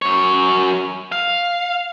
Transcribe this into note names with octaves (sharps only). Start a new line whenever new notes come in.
F#2 C#5
F5